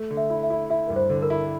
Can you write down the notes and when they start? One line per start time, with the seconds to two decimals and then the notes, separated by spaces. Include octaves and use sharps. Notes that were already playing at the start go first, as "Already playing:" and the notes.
Already playing: A3
0.10 D3
0.17 E5
0.30 E4
0.43 E5
0.50 E4
0.70 E4 E5
0.87 G2 A#4
0.96 C5
1.10 D3
1.22 A#4
1.30 E4